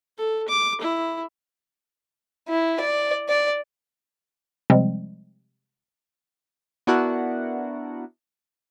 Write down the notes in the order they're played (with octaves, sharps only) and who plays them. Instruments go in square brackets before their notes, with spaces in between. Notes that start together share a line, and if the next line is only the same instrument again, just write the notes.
[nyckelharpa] A4
D6
E4
[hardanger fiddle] E4
D5
D5
[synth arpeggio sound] C3 F3 G3 G#3 C4
[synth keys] B3 D4 E4 F#4 A#4 F#5